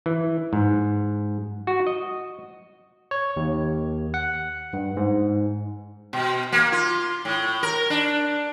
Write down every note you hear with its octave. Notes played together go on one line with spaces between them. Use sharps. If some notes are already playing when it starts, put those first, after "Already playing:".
E3
G#2
F#4
D#5
C#5
D#2
F#5
G2
G#2
B2
A#3
F4
A2
A#4
D4